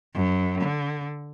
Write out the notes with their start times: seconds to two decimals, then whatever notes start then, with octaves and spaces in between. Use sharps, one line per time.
0.14 F#2
0.61 D3